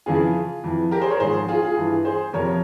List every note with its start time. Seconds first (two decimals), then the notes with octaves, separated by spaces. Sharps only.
0.06 F2 C#3 E3 F4 G#4
0.64 F2 E3
0.91 G4 A#4
1.00 G#4 C5
1.10 A#4 C#5
1.20 G#2 F3 G#4 C5
1.48 F4 G#4
1.63 F4 G#4
1.76 G2 E3
2.05 G#4 C5
2.33 F2 C3 F3 A#4 C#5